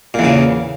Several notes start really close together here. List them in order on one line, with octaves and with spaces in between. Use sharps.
A#2 E2 C#3